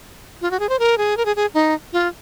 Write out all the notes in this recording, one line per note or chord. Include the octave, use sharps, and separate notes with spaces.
F4
F#4
G#4
C5
A#4
G#4
A#4
G#4
G#4
D#4
F4